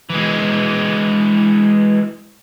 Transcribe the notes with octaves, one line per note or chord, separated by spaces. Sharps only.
E3 G#3